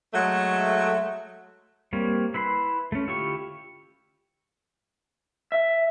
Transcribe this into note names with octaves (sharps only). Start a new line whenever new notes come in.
F#3 G#3 A3
G3 A#3 C4 C#5
E4 B4 B5 C6
A3 C#4
D3 E4 F4 G4 C#6
E5